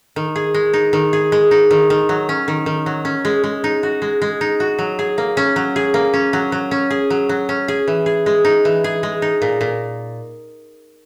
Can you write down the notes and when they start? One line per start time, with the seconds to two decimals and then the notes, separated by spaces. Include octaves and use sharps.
0.16 D#3
0.36 G#4
0.54 G#3
0.73 D#4
0.93 D#3
1.13 G#4
1.32 G#3
1.51 D#4
1.71 D#3
1.90 D#3
2.09 F#3
2.29 C#4
2.48 D#3
2.66 D#3
2.86 F#3
3.05 C#4
3.25 G#3
3.44 G#3
3.64 D#4
3.83 F#4
4.02 G#3
4.22 G#3
4.41 D#4
4.60 F#4
4.79 F#3
4.99 G#4
5.18 A#3
5.37 C#4
5.56 F#3
5.76 G#4
5.94 A#3
6.14 C#4
6.33 F#3
6.52 F#3
6.71 C#4
6.90 G#4
7.10 F#3
7.29 F#3
7.49 C#4
7.68 G#4
7.88 E3
8.06 G#4
8.26 G#3
8.45 D#4
8.65 E3
8.84 G#4
9.03 G#3
9.22 D#4
9.42 A#2
9.61 A#2